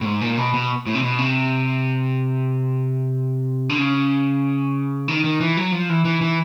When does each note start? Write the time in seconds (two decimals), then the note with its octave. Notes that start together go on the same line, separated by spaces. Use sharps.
0.01 A2
0.05 G#2
0.21 A#2
0.37 B2
0.54 B2
0.86 A2
0.95 C3
1.02 B2
1.18 C3
3.69 D3
3.78 C#3
5.08 D#3
5.24 D#3
5.41 E3
5.57 F#3
5.72 F3
5.89 E3
6.05 E3
6.21 E3